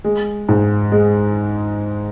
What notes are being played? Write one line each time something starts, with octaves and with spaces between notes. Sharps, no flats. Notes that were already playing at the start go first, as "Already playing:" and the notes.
G#3
G#2
G#3